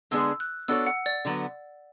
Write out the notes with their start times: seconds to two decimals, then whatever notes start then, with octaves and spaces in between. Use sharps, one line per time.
0.11 D3 G#3 B3 D4 G#4 E6
0.40 F#6
0.68 B3 D4 F#4 A4 C#5 E6
0.86 F#5
1.06 D5
1.25 D3 F#3 B3